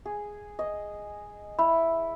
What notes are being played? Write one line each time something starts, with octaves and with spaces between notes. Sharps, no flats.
G#4
D#5
E4 B5